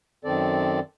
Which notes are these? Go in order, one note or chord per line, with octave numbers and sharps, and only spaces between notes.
F#2 D#3 C4 A4 D5